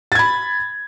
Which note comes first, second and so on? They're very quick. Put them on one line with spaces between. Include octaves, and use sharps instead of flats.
A6 G#6 B5